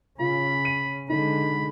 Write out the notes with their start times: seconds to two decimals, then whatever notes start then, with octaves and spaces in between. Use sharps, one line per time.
0.19 C#3 C#4 F4 B5
0.65 D#7
1.09 D3 G#3 D#4 B5